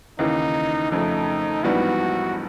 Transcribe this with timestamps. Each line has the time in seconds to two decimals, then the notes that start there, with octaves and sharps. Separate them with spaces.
0.19 D#2 C#3 E3 D#4
0.91 F2 C#3 F3 A3 D#4
1.64 A#1 G#2 E3 G3 B3 F#4